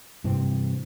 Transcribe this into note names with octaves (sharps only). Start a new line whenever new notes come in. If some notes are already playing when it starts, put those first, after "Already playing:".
G2 C3 E3 C4